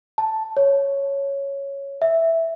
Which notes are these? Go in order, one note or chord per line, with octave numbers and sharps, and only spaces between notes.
A5
C#5
E5